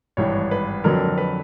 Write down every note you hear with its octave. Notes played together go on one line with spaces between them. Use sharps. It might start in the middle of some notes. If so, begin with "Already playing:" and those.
G#1 G2 E3 C#5
B4
F2 D3 F#3 A#4
B4